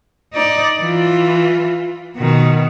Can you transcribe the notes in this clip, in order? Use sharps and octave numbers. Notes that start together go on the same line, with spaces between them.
D#4 D5
E3 F4
B2 D#3